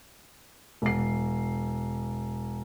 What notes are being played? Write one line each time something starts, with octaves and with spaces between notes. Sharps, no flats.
E1 C7